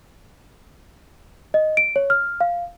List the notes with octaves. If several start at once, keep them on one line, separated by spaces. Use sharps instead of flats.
D#5
D7
C#5
F6
F5